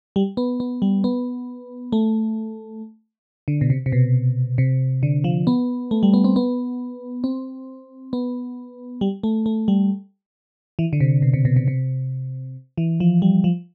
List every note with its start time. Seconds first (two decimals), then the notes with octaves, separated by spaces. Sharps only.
0.16 G3
0.37 B3
0.60 B3
0.82 G3
1.04 B3
1.92 A3
3.48 D3
3.61 B2
3.70 C3
3.86 C3
3.92 B2
4.58 C3
5.03 D3
5.24 F3
5.47 B3
5.91 A3
6.03 G3
6.14 B3
6.24 C4
6.36 B3
7.24 C4
8.13 B3
9.01 G3
9.23 A3
9.46 A3
9.68 G3
10.79 E3
10.93 D3
11.00 C3
11.22 B2
11.33 C3
11.45 B2
11.56 C3
11.68 C3
12.78 E3
13.00 F3
13.22 G3
13.44 F3